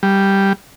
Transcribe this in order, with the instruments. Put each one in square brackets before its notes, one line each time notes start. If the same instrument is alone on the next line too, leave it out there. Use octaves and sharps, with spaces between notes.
[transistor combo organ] G3